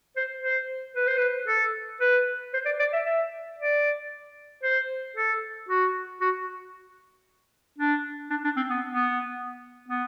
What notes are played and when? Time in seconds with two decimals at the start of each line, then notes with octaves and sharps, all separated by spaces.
0.16 C5
0.43 C5
0.96 B4
1.07 C5
1.18 B4
1.47 A4
2.00 B4
2.54 C5
2.66 D5
2.80 D5
2.93 E5
3.06 E5
3.59 D5
4.63 C5
5.16 A4
5.69 F#4
6.21 F#4
7.78 D4
8.30 D4
8.44 D4
8.56 C4
8.70 B3
8.90 B3
9.88 B3